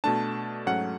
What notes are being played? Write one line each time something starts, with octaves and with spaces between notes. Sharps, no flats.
B2 A3 D4 A5
G#2 F#3 A3 C#4 F#5